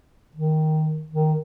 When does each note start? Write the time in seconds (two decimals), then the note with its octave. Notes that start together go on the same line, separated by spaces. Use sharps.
0.36 D#3
1.11 D#3